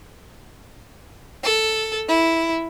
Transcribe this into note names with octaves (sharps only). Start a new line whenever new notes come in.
A4
E4